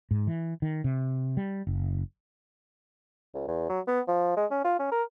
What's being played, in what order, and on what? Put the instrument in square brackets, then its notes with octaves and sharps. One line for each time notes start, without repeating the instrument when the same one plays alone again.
[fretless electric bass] G#2
E3
D#3
C3
G3
F#1
[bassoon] C#2
E2
F#3
B3
F3
G#3
C#4
F4
C#4
A#4